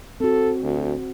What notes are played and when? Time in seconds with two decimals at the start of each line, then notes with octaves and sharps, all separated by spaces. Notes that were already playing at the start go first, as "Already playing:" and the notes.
0.20 C4 F#4 A4
0.63 D2